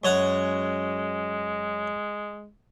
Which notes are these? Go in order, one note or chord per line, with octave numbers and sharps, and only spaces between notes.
F#2 G#3 C#5 F#5